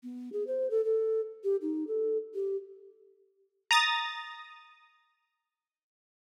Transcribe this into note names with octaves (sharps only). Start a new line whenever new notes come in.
B3
G#4
C5
A4
A4
G4
D#4
A4
G4
A#5 D#6 A6